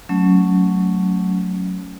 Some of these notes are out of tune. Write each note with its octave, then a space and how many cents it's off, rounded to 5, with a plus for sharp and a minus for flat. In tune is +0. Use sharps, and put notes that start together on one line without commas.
F#3 +0 A3 +0 C#4 +0